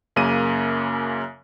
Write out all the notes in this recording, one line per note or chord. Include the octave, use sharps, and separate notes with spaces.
F#2 C#3 A#3 D#7